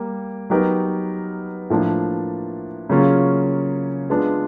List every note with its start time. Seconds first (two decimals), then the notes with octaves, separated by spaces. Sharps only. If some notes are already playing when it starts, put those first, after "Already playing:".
Already playing: G3 A#3
0.50 F#3 B3 D#4 G4 A#4
1.70 A2 F3 A#3 D4
2.90 C#3 F#3 A#3 C#4 F4
4.09 G#3 B3 D4 F4